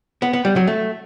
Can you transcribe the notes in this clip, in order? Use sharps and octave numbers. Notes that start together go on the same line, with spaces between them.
B3
B3
G3
F#3
A3